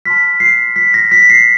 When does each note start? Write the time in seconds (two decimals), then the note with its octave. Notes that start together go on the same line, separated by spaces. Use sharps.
0.05 A5 C6 F6 B6
0.40 C7
0.76 B6
0.94 A#6
1.12 B6
1.30 C7